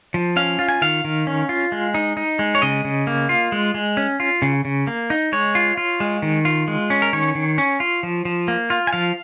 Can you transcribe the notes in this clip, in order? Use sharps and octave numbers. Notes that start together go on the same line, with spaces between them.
F3
C#4 F5
F4
G#5
D#3 F5
D#3
C#4
F4
G#3
D#4
D#4
G#3
C#5
C#3 D#5
C#3
A#3
F4
G#3
G#3
C#4
F4
C#3
C#3
A#3
D#4
G#3 C#5
F4
F4
G#3
D#3
F4
G#3
C#4
A#4
D#3 C#5
D#3
C#4
F4
F3
F3
A#3
F4
G#5
F3 F5